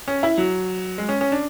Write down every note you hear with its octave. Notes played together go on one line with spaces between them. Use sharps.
C#4
E4
F#3
G#3
C#4
C#4
D4